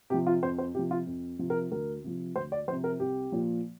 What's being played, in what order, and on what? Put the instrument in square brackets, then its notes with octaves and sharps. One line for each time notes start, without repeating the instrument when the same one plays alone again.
[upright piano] C3 G4
F3
F4
F2 C5
C5
C3 G4
F3
F4
F2
C3 F3
A#4
D2 A#4
C3 F3
D2 C5
D5
F3 C5
C3
A#4
C2 G4
A#2 F3